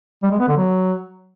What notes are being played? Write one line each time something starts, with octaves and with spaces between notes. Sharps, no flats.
G3
G#3
B3
D3
F#3